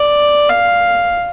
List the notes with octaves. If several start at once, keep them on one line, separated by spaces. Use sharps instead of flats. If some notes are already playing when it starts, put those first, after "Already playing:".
Already playing: D5
F5